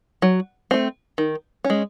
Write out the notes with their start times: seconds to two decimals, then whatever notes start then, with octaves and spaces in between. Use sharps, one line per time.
0.22 F#3
0.71 A3 C4
1.18 D#3
1.64 C#4
1.70 G#3